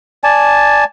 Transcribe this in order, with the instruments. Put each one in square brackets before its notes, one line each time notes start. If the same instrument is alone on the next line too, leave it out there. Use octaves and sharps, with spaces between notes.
[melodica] D5 G#5 A5